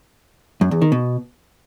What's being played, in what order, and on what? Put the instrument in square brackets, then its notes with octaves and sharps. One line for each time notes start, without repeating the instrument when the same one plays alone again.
[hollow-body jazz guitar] F#2
E2
D#3
B2